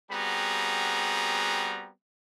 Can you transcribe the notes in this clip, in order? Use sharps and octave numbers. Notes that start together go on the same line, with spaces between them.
G3 B3 C4 F#4 G#4 A#5